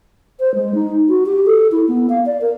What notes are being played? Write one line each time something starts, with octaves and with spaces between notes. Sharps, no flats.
C5
G#3
D#4
F#4
G4
A4
E4
B3
F5
D5
A#4